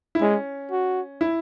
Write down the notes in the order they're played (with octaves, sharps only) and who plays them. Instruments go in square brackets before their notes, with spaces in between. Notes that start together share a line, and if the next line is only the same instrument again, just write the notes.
[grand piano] E4
[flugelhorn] G#3 [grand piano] C#4
[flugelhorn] F#4
[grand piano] E4